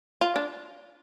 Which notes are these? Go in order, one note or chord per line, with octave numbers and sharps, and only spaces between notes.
F4
D4